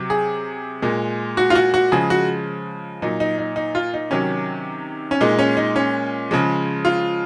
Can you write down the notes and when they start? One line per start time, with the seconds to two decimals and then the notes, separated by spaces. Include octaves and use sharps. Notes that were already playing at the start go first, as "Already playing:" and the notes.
Already playing: C3 F#3
0.10 G#4
0.82 A#2 G#3
1.37 F#4
1.50 F4
1.55 F#4
1.74 F#4
1.92 C#3 F3 G#3 G#4
2.10 F#4
3.02 A#2 F#3 D#4
3.20 D#4
3.38 D#4
3.56 D#4
3.75 F4
3.94 D#4
4.11 C3 D#3 F#3 C#4
5.11 C#4
5.21 A#2 G#3 D#4
5.39 C#4
5.57 D#4
5.76 C#4
6.31 C#3 F3 G#3
6.85 F4